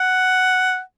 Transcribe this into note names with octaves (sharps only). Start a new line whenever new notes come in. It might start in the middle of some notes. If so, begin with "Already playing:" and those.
Already playing: F#5